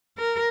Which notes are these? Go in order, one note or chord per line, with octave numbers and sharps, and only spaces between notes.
A#4